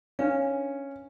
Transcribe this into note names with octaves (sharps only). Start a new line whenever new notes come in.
C#4 D4 B4 F5